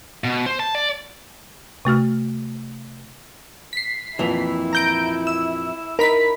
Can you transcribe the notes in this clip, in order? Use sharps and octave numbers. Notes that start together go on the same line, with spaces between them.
B2
C5
A5
D5
C3 A3 F#4 F6
B6 C7
F2 A#2 E3 E4
A#5 G6 D7
E6
D#4 A#4 B5 B6